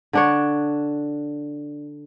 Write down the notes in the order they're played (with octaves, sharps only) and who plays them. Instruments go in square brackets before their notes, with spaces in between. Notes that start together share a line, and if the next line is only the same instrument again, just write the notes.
[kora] D3 D4 C#5